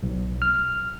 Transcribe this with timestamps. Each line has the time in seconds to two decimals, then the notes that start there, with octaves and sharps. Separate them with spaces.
0.03 B1
0.42 F6